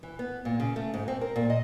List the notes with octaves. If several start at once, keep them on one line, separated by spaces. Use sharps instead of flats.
E3
B3
A#2
C#3
A3
G#2
C4
A#4
A#2
D#5